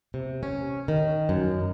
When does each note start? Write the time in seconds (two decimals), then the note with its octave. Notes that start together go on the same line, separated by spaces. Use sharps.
0.14 C3
0.43 C#4
0.88 D#3
1.29 F#2